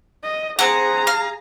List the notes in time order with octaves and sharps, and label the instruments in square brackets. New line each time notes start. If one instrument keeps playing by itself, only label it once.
[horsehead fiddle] D#5
[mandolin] C4 F#5 [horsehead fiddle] G#4 A#5
[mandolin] F5